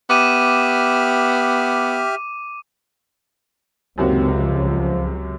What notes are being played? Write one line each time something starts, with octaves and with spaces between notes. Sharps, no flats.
B3 G4 E5 D6 F6 D#7
C#2 F#2 C3 D#3 A#3 C4 F#4
F3